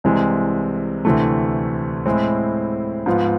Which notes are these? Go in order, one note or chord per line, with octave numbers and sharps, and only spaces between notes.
C2 C3 E3 G#3
D2 C3 E3 A3
A2 G#3 C4 E4
G#2 F3 B3 F4